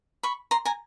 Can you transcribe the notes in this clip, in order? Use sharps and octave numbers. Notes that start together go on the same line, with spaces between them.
B5 C#6
A#5 C6
G#5 A#5